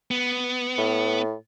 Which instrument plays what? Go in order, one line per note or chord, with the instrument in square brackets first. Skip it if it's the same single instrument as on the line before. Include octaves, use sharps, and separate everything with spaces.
[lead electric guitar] B3
[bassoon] A2